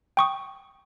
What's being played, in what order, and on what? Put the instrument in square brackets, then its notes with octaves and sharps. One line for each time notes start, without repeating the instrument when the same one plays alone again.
[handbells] G5 C#6 D#6